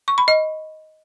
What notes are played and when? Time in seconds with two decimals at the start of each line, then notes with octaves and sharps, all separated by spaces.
0.08 C#6
0.18 B5
0.28 D#5